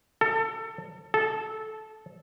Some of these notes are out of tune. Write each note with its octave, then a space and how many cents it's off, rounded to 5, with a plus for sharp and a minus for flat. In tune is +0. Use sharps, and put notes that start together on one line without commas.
A4 +25
A4 -15